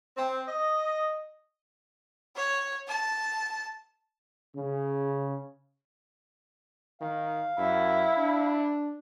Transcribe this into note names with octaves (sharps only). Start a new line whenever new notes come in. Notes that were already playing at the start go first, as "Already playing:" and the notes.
C4
D#5
C#5
A5
C#3
D#3 F5
F#2 E4
D4